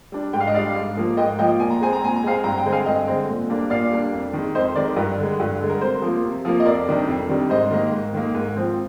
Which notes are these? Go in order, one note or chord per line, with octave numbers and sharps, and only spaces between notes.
G3 D4
G#2 G5
F5
D#5
G3 D4 D5 F5
G#2
F3 A#3
G#2 D#5 G5
F3 A#3 D#5 G5
A#2 G#5
A#5
G#3 C4 G#5
A#5
A#2 G#5
A#5
G#3 C4 F5 G#5
G2 G5 A#5
G5 A#5
D3 G#3 C4
F5 G#5
G2 D#5 G5
D3 G#3 C4
A#2
G3 A#3 D4
A#2 D5 F5
G3 A#3 D4
F2
D#3 G#3
F2 C5 D#5
D#3 G#3 A#4 D5
G2 A#4
D3 G#3
G2
D3 G#3
A#4
C3 C5
F3
A#3
C3
F3 A#3
D#5
F2 A#4 D5
C3 D#3 G3 D4
F2
C3 D#3 G3 D4
G#2 C5 D#5
D#3 A#3
G#2
D#3 A#3
G#2
F3 C4